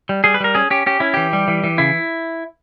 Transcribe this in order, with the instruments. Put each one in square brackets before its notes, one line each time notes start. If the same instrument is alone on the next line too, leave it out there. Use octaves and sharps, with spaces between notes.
[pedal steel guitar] G3
G3 G#4
B4
G3 A#4
C#4 G#4
C#4 G4
C#4 G4
C#4 E4
E3 G4
G3
E3
E3
C#3 E4